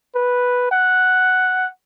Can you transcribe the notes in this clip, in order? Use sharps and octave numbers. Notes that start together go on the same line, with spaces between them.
B4
F#5